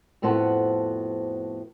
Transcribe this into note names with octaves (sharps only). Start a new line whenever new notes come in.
F2 A2 B3 F#4 C5 A5